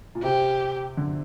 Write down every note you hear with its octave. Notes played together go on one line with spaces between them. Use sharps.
A#2
C3 G4
D3